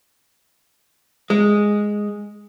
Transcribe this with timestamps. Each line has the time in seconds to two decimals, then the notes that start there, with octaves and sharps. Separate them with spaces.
1.30 G#3